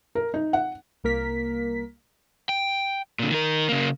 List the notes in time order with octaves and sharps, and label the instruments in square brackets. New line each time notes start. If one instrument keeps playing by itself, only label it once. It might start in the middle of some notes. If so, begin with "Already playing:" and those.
[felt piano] A#4
D#4
F#5
[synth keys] C2 A#3 A#4 B6
[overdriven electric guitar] G5
A#2 D3
D#3 A#4
C#3 A#3